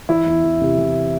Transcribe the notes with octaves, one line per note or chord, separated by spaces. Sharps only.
E3 E4
E2
E2
C3
E3